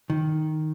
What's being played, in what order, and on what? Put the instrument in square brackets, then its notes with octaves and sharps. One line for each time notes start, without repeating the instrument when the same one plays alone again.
[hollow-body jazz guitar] D#3